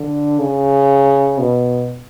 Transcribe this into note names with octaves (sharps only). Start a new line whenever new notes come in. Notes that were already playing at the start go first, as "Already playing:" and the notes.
Already playing: D3
C#3
B2